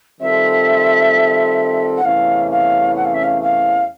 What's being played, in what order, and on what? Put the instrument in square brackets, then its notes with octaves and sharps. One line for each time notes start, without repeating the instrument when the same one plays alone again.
[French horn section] D#3 G3 C4 F4 A4 [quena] E5
[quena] F#5
[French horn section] E2 C3 E3 A3 C#4 [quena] F5
[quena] F5
F#5
F5
E5
F5
F5